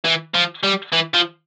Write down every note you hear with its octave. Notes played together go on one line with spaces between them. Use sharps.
E3
F3
G3
E3
F3